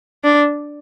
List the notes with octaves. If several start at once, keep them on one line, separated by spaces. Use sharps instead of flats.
D4